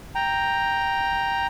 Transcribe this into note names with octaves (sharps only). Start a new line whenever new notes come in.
G5 A#5